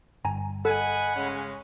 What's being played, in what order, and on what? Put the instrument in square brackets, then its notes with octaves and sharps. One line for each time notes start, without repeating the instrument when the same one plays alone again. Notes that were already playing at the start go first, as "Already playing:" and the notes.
[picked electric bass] G1 [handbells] G#5 A#5
[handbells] A4 [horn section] D#5 G#5 [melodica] F#5 B5
[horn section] C#3 G#3 C#4